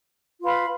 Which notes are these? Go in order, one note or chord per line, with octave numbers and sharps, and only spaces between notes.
F4 B4 F5 B5